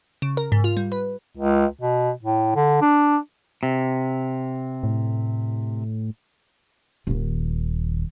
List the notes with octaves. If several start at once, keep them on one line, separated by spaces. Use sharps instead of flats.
C#3
A#4
G#2
F4
G3
B4
C#2
B2
A2
D3
D4
C3
A2
D#1 D#3